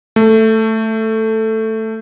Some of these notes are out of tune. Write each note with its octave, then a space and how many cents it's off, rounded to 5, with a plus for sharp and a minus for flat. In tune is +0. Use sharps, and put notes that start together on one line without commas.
A3 +5